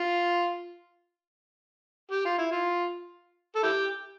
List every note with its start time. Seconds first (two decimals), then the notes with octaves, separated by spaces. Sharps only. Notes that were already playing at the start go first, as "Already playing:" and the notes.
Already playing: F4
2.12 G4
2.25 F4
2.38 E4
2.52 F4
3.56 A4
3.63 E4 G4